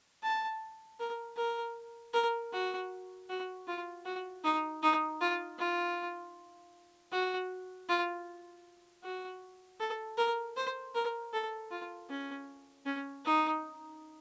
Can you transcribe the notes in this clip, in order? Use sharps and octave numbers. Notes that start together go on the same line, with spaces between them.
A5
A#4
A#4
A#4
F#4
F#4
F4
F#4
D#4
D#4
F4
F4
F#4
F4
F#4
A4
A#4
C5
A#4
A4
F4
C#4
C#4
D#4